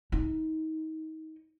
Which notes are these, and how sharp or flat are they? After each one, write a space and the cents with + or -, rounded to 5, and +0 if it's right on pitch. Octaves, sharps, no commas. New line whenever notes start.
D#4 +30